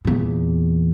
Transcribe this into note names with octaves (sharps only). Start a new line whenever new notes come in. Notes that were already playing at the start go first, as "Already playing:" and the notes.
E2 A#2